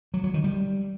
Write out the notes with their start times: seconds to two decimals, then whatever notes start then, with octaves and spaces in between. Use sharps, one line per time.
0.14 F#3
0.24 F#3
0.34 D#3
0.44 G3